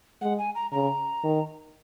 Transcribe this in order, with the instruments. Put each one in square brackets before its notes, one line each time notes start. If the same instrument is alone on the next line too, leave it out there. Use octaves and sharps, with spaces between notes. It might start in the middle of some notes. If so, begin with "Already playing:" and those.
[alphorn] G#3 [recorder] F#5
[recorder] G#5
A#5
[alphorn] C#3 [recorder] A#5
[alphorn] D#3